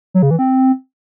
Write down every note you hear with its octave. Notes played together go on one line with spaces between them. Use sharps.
F#3
C#3
E3
C4